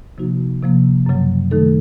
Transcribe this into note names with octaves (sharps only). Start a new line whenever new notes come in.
C3 F3 A#3 D#4 F#4
C3 F3 A#3
F#2 C#3 F#3
D#3 A3 D#4 A4